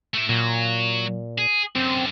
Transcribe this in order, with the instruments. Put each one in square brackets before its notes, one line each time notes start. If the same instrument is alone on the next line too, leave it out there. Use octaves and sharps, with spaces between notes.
[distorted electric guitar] A3 E4
[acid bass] A#2 [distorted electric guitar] F#3
[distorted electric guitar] G#4
[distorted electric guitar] F#2 D3 [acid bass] C4